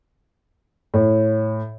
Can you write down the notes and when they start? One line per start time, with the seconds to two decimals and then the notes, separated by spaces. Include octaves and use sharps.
0.94 A2